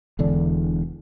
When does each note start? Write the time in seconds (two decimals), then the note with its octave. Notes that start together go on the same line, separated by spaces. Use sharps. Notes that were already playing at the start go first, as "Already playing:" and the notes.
0.19 E1 E2 D3 D4